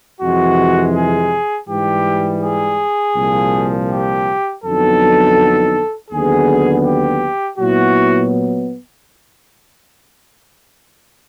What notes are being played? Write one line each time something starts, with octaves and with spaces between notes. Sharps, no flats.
F2 C3 E3 G#3 F#4
G#4
G#2 E3 G3 G4
G#4
C2 A#2 F3
G4
F2 D3 F#3 B3 D#4 A4
D#2 D3 F#3 B3 G#4
G4
A#2 F#3 B3 E4 F#4